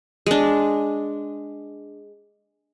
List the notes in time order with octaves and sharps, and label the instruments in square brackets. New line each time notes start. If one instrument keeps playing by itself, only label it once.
[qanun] G#3 D4